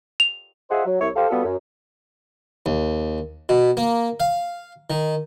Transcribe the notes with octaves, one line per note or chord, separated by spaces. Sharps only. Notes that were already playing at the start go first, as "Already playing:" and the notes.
F7
F4 G#4 C5 D#5 E5 F#5
F#3
C2 E4 C#5
G4 A4 C5 F5
G3 B3 F4 F#4 A4
F#2
D#2
B2
A#3
F5
D#3